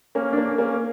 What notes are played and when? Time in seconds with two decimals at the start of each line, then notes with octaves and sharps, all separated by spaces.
0.15 A#3 C#4
0.33 D4
0.37 A#3 C#4
0.58 A#3 C#4